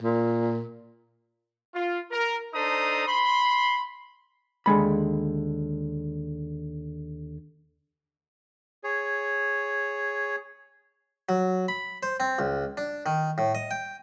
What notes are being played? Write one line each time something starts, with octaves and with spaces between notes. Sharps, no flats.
A#2
F4
A#4
D4 D#4 A4 C5 A#5 D#6
B5 C6
D#2 D3 G#3 B5
G#4 C#5
F#3
B5
C5
C4
C#2
D4
D#3
A2
D#5
G5